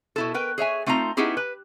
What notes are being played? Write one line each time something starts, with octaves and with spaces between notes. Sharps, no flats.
B2 E4 A4
A#4 B4 G5
G#4 C#5 E5 G#5
A3 C4 D#4 F4 A#5
B3 C#4 D#4 E4 G4 G#4
B4